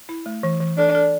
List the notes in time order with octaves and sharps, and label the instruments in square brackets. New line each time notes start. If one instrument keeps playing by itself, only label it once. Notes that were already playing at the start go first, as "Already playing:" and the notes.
[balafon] E4
A3
E3
E3
[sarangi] D4 [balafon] A4
[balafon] A4